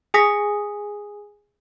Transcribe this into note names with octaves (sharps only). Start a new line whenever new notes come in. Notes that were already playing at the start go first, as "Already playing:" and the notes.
G#4 G#5 D#6 A#6 B6